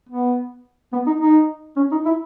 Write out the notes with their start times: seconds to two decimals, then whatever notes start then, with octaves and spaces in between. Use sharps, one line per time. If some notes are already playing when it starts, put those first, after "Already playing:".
0.09 B3
0.93 B3
1.07 D#4
1.21 D#4
1.76 C#4
1.91 D#4
2.06 E4